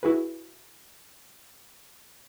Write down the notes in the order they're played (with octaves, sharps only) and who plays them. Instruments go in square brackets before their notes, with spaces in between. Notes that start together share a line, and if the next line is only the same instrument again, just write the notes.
[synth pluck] E4 F#4 G#4 B4